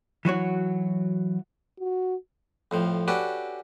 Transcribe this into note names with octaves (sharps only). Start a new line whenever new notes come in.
E3 F#3 F#4 C#5
F#4
F2 A2 F3
C#4 D4 F#4 G4 A4 B4